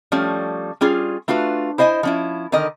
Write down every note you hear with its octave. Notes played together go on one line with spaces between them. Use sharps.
F3 G3 A3 C#4
G3 C#4 F4 G#4
A3 D4 F4 F#4 B4
E4 C5 D#5 F5 G#5
F3 C#4 E4
D3 D#3 A#4 D#5